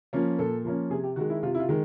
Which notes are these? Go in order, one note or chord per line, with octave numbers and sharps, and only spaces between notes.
F3 A#3 C#4
A#2 A4
F3 A#3 C#4
C3 G#4
G4
D#3 G#3 F#4
E4
C3 F4
E4
F4
D#3 G#3